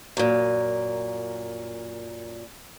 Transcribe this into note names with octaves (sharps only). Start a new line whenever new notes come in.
F#2 A#2